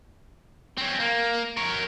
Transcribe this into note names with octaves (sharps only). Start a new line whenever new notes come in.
C4 C#4
A#3
A#4 C#5